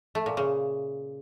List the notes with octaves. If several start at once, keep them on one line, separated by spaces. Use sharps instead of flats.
A3
A#2
C#3